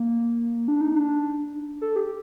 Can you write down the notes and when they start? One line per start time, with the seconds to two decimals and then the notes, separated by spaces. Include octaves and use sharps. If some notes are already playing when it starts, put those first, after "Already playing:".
Already playing: A#3
0.68 D4
0.81 D#4
0.94 D4
1.81 A4
1.96 G4